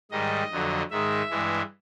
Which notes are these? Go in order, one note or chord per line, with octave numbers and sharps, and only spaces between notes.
G#2 D#3 G3 D#5
F2 D3 F#3
G#2 D#3 G#3 E5
G2 E3 G#3